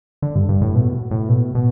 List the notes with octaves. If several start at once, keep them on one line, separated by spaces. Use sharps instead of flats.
D3
G2
G2
A2
B2
A2
B2
B2